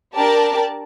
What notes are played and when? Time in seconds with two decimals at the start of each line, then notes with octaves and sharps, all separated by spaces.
0.15 D4 G4 A#4 D5 A5